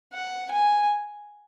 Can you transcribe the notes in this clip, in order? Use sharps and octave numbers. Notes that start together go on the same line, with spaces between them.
F#5
G#5